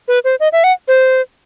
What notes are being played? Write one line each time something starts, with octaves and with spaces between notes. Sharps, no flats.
B4
C5
D#5
E5
F#5
C5